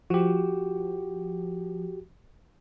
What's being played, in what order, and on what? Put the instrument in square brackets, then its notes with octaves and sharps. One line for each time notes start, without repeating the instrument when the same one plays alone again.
[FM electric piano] F3 [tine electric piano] F#4 G4